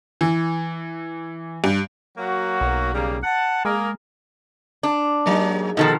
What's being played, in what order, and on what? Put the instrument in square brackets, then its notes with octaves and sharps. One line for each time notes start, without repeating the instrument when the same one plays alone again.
[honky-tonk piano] E3
G2
[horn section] F#3 A#3 F#4
[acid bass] B1
[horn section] C#3 G3 A#3
F#5 A5
[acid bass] G#3 [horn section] A#3 G#4 A#4
[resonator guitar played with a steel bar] D4
[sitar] G#2 F#3 A#3
[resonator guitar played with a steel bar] B2 D#3 F3 [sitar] D#4 A4